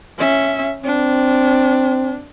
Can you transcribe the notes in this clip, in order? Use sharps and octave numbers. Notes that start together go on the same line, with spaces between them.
C#4 E5
C4 D4